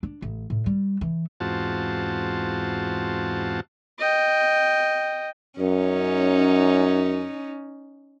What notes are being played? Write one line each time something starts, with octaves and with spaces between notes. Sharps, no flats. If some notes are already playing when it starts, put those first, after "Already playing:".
D4
A1
A2
G3
E3
E2 G#2 C4 F4 F#4 A5
D#5 G5
F#2 C#4 D#4